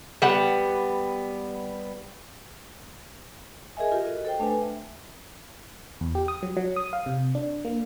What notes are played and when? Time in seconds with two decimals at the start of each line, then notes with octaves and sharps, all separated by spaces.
0.22 G3 B3 F#5
3.77 G#4 A#4 D#5 E5 G#5
3.92 F4 G4 A4 A#4
4.05 F#4 D#5
4.25 A4 C5 G5
4.39 A3 D4 B4 G#5
4.61 E5
6.01 E2
6.15 G4
6.28 D#6
6.42 F#3
6.57 F#3
6.76 D#6
6.93 F5
7.06 C3
7.35 D4
7.65 A#3